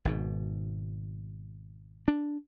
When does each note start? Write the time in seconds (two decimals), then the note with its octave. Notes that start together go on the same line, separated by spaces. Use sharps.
0.05 G#1 G#2 B2
2.08 D4